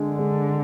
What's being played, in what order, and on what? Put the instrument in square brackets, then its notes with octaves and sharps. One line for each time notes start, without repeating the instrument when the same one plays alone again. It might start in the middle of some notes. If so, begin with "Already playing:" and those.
Already playing: [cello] D3 [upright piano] G#3 D4
[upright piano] G#3